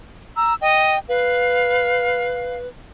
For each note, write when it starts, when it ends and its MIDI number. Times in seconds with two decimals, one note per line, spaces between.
0.36 0.54 82
0.36 0.55 88
0.61 0.96 75
0.61 0.99 79
1.09 2.68 71
1.09 2.57 77